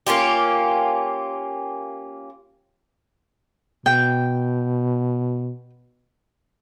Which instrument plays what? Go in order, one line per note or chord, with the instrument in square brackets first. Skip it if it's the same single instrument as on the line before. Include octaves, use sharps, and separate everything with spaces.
[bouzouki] A#3 C#4 F4 G4
[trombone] B2 [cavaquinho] G5